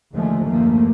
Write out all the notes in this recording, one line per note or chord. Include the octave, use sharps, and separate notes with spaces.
D#2 D3 F3 G#3 A3
E2 G2 F3 A3 A#3